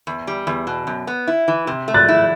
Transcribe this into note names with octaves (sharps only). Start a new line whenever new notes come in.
E2
G3
E2
B2
F#2
B3
E4
E3
C3
A3
F#6 A6
E4